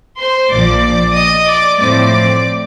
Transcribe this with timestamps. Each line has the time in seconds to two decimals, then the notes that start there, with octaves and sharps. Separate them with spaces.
0.18 C5 C6
0.50 A#1 A#2 F3 D5 D6
1.14 D#5 D#6
1.46 D5 D6
1.79 A2 F3 C4 D5 D6